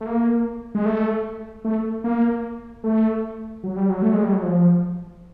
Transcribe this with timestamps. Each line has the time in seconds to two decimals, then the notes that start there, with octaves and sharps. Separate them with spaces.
0.01 A3
0.06 A#3
0.75 G#3
0.85 A3
1.65 A3
2.04 A#3
2.84 A3
3.64 F#3
3.76 G3
3.90 F#3
4.02 A3
4.13 G#3
4.23 G3
4.33 F#3
4.43 F3